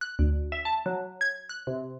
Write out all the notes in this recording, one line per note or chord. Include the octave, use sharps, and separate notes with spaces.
F#6
D2
E5
A5
F#3
G#6
F#6
C3